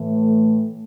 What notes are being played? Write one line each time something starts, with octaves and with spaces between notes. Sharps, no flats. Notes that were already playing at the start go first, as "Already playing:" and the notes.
Already playing: A2 E3 A3